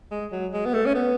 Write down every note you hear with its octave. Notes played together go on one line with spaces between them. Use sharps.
G#3
F#3
G#3
B3
A3
C#4
B3